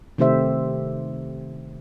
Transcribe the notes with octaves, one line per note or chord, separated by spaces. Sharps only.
C3 D#3 A3 G4 C5 E5